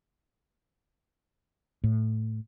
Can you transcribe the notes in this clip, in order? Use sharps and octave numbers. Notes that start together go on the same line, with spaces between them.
A2